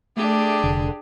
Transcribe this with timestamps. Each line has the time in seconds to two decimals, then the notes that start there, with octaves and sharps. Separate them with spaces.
0.17 A3 D4 G4 G#4
0.64 F1 D3